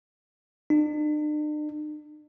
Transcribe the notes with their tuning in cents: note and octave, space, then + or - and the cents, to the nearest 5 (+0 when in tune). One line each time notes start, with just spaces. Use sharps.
D4 +45